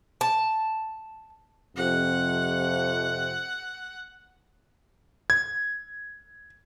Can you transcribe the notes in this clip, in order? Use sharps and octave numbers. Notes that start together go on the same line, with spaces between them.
A5
F2 C3 F#5
G#6